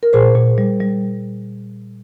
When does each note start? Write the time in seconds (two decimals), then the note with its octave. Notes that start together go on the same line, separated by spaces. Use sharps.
0.03 A#4
0.13 A#2 G#4 C5
0.35 A#2
0.58 G3
0.80 G3